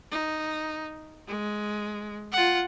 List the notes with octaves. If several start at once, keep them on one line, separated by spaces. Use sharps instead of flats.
D#4
G#3
F4 F#5